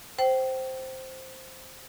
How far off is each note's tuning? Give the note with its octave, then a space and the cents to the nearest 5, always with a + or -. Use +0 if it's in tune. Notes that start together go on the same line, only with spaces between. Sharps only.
C5 +0 G5 -25